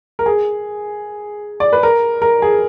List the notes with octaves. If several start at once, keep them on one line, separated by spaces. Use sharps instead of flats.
A#4
G#4
D5
B4
A#4
A#4
G#4